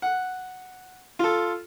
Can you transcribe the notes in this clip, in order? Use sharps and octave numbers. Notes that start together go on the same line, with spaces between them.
F#5
F4 A4